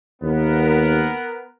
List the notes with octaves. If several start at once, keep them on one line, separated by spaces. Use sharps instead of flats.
D#2 B3 A#4